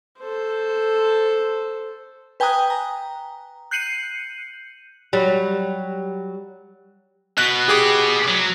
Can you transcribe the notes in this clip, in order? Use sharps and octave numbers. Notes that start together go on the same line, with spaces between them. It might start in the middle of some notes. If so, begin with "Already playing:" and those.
A4 C5
B4 G5 G#5 A#5 D#6 F#6
A#5
F#6 G6 C7 C#7 D#7 F#7
F#3 G3
B2 B3 F#6
G4 G#4 D6
F#3